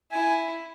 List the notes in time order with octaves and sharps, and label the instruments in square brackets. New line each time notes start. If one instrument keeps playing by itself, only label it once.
[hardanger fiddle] E4 [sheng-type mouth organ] G#5